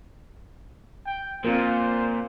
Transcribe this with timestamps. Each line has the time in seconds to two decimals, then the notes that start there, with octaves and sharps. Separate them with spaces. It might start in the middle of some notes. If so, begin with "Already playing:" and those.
1.06 G5
1.45 A#2 C4 F4 A#4 C5